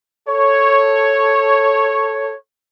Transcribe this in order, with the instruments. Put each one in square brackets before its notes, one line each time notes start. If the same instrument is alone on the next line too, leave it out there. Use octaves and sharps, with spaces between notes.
[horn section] A4 C#5